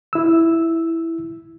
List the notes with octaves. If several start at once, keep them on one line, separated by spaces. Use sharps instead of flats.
E4 E6